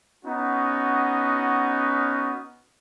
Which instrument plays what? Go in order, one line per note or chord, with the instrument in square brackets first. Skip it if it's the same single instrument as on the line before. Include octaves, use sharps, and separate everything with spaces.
[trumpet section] B3 C#4 D#4 F#4